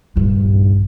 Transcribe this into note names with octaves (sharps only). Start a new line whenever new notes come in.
A#1 G2